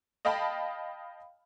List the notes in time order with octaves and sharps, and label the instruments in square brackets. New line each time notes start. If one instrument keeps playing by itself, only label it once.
[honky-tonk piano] D#5 F5 G5 A5 B5